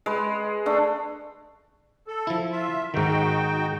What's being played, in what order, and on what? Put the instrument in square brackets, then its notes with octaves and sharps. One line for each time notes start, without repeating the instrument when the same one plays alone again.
[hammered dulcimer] G#3 B4
A3 D4
[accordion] A4
[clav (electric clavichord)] F3 E4
[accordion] F4 E5
[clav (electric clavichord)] G#2 D#3 [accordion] D#4 F#4 G5